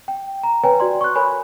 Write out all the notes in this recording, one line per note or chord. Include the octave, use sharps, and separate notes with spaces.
G5
A#5
B4 C#5 G5 G#5 A#5
F#4 D5 C6
C#6 F#6
A#4 C#5 G#5 B5